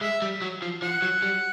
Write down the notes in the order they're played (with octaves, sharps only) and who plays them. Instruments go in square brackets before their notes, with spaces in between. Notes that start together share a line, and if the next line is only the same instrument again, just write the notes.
[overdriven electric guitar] G#3 [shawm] E5
[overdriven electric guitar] G3
F#3
F3
[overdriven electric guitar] F3 [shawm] F#5
[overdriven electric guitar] F#3
G3